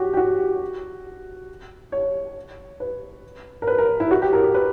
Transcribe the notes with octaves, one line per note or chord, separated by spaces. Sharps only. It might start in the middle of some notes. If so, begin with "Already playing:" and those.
Already playing: F#4 G4
G4
F#4
C#5
B4
A#4
B4
A#4
E4
F#4
G4
A#4
B4